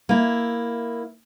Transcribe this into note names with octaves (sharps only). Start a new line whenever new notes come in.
A#3 E4